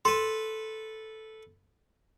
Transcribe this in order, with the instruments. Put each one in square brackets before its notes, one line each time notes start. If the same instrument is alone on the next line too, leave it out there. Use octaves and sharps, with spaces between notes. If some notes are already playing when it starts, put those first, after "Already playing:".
[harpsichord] A4 B4 [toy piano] C6